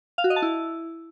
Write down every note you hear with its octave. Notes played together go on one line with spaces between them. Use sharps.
F5
F#4
D#5
A5
E4